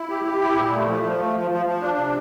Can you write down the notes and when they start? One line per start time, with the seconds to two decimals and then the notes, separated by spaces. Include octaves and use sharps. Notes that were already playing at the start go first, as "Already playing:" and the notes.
Already playing: E4
0.09 G4
0.25 G4
0.41 E4
0.55 A#2
0.72 A3
0.87 F3
1.03 F3
1.18 A3
1.35 F3
1.51 F3
1.66 F3
1.81 D4
1.97 C3